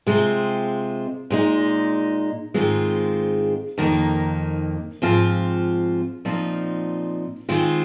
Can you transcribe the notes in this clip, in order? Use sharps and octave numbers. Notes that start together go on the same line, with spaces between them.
C3 G#3 C4 F4
A#2 G#3 D#4
G#2 D#3 G#3 C4 F4
F2 D#3 A#3 D#4
G#2 F3 C4 F4
A#2 F3 C4 D#4
D#3 G#3 C4 F4